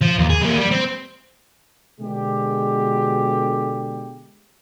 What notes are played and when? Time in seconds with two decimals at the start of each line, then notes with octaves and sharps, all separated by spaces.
0.01 F3
0.18 D#2
0.30 G#4
0.43 G3 A#3
0.60 G3
0.72 C4
2.01 B2 D3 G#3 G4